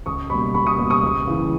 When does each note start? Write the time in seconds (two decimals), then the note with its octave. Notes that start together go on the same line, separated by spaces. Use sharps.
0.06 C#2 C#6 D#6
0.30 B2 G3 A#3 B5 C#6
0.54 C#2 B5 C#6
0.66 C#6 D#6
0.78 B2 G3 A#3
0.90 C#6 D#6
1.03 C#2
1.27 C#3 E3